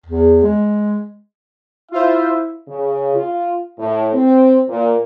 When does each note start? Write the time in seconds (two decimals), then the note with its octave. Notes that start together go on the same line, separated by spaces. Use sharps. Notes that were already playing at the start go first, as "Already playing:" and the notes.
0.06 E2
0.43 G#3
1.92 E4 F4 C5 E5
2.68 C#3
3.15 F4
3.79 A2
4.13 C4
4.69 A#2